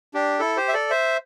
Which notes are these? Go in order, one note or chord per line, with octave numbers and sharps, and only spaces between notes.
D4 G4
E4 A4
G4 C5
E5
A4 D5
C5 E5